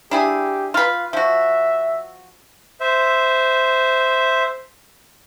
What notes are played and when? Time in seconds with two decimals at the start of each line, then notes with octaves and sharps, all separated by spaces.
0.11 D4 E4 G4 G#4
0.74 F4 B4 F5
1.13 F3 F#4 E5
2.81 C5 E5